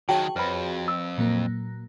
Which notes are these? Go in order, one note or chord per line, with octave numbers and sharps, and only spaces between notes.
D#3 F#3 F#4 G#4 C#5 G5 A5
F2 B4 C5 B5
E6
A#2 F#3 A#3